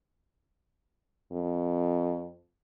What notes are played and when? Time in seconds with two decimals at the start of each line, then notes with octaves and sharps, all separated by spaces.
1.32 F2